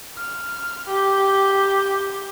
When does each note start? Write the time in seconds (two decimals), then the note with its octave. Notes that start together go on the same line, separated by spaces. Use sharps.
0.14 F6
0.87 G4